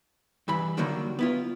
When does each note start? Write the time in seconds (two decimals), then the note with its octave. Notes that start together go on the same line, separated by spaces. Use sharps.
0.48 G2 E3 B5
0.77 D3 D#3 F#3 G3 A#3 D4
1.19 B3 E4 F4